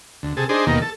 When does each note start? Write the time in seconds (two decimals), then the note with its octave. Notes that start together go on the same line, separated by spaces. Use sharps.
0.23 D2
0.37 C3 G#4 A4
0.49 D4 D#4 G#4 C5
0.67 D#2 B2 D#3 A#3
0.82 A4